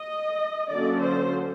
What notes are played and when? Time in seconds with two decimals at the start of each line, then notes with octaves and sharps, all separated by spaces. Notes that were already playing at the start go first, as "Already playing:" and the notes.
Already playing: D#5
0.71 D3 F#3 A#3 C#4 D5
1.00 C5